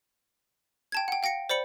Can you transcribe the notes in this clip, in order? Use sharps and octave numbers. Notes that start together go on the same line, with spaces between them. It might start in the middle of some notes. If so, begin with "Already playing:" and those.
G5 A5 G#6
F#5 G5
F5 G5 A#6 C#7 D7
C5 D5 B5 C#7 F#7